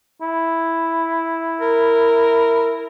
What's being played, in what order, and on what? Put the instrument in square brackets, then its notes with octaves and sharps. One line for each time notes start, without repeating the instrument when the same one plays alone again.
[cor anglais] E4
[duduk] A#4